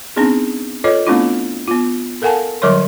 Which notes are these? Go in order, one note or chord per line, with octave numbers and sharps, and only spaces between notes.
B3 C4 D4 D#4 G#4
F4 A4 B4 C#5 D#5
A3 B3 C4 D4 E4 F4
B3 F4
A4 A#4 F5 F#5 G#5 A5
D3 F#3 G3 A#4 C#5 C6